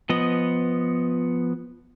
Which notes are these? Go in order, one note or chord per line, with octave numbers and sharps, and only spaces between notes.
F3 B3 D#5